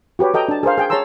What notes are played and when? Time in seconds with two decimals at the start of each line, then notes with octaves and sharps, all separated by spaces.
0.19 F#4 G4 B4 C#5
0.34 A4 D#5 G5 A#5
0.48 D4 A5
0.63 G#4 A#4 C5 F5
0.78 G#4 G5 G#5
0.90 G#4 C#5 A5 A#5 C6 E6